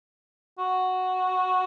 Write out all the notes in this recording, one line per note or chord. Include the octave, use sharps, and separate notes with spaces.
F#4